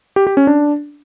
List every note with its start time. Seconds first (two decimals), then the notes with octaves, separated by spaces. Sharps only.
0.16 G4
0.27 G4
0.37 C#4
0.47 D4